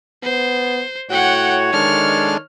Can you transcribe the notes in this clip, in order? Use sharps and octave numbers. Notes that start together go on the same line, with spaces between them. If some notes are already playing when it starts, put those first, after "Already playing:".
B3 C5
A2 F#4 C#5 F#5 G5
D#3 G#3 D4 A4 F6